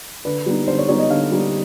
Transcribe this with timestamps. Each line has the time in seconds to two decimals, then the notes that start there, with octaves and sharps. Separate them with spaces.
0.25 D3 B4
0.46 G3 B3 D#4
0.67 D3 C5
0.79 C#5
0.89 G3 B3 D#4 C#5
0.99 D#5
1.10 D3 F5
1.32 G3 B3 D#4